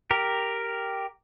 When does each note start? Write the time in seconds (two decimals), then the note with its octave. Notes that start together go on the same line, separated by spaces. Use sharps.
0.11 G4 A#4